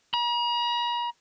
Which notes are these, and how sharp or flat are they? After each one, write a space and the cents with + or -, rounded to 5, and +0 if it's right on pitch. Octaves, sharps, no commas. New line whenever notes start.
A#5 +45